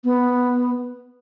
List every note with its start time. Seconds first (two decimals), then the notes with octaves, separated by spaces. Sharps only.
0.04 B3